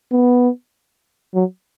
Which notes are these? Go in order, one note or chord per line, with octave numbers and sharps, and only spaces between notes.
B3
F#3